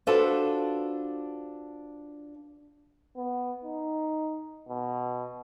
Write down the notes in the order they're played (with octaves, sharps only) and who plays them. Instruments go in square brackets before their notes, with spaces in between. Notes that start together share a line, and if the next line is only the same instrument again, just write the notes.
[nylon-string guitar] D4 F4 F#4 A4 B4 C5
[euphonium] B3
D#4
B2